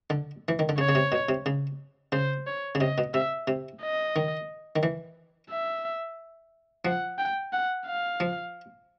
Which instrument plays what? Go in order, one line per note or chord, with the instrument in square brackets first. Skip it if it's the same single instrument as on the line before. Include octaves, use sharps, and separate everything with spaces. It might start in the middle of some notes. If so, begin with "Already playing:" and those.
[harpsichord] D3
E3
D#3
D3
[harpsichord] C#3 [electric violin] C#5
[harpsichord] C#3
C3
B2
C3
C#3
[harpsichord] C#3 [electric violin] C5
[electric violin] C#5
[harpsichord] C#3
[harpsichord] C3 [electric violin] D#5
[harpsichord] B2
[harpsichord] C3 [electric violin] E5
[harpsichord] C3
[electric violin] D#5
[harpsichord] D#3
D#3
E3
[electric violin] E5
[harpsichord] F3 [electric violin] F#5
[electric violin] G5
F#5
F5
[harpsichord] F3